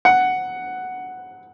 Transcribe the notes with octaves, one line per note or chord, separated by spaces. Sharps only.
F#5